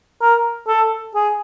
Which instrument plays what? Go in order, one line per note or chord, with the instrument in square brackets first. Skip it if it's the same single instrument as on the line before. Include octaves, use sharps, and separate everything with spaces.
[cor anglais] A#4
A4
G#4